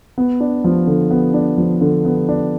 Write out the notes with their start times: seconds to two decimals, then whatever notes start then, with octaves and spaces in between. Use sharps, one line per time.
0.18 B3
0.40 D4
0.64 F3
0.87 D3
1.11 B3
1.34 D4
1.58 F3
1.81 D3
2.05 B3
2.29 D4